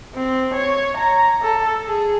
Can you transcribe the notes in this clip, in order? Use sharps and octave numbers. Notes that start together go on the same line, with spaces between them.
C4
C#5
A#5
A4
G#4